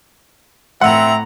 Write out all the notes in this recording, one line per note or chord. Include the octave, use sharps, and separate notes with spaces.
A2 C4 E5 F#5 A#5